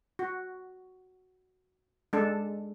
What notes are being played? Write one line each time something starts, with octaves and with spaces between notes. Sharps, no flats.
F#4
G#3 D4 A4